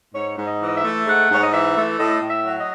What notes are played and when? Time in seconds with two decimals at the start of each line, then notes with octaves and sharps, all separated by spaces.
0.14 G#2 C#5
0.37 G#2
0.46 D#5
0.61 E3
0.67 D#5
0.76 E5
0.84 A3
1.06 G#2 F#5
1.29 G#2 C#5
1.42 D#5
1.52 E3 E5
1.76 A3
1.98 A2 D#5
2.22 A2
2.29 E5
2.45 F#3
2.60 D#5